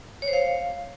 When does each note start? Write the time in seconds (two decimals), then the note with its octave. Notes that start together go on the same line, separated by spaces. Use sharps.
0.22 C#5
0.28 C5
0.33 F5